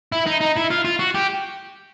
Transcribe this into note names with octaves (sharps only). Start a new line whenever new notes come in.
E4
D#4
D#4
E4
F4
F4
F#4
G4